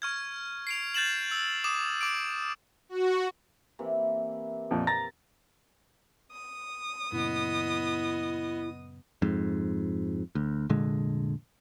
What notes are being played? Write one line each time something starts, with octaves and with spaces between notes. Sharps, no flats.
C#6 F6 G#6
C7 D7 F7
G6 A6 E7 F#7
E6
D6 D#6 E7
D6 D7
F#4
C3 E3 A#3
E5
F2 A#2
A#5 A6 A#6
D#6
F#2 A#2 C#3 B3 E4 D#5
F2 G#2
D2
F1 A#2 D3 G#3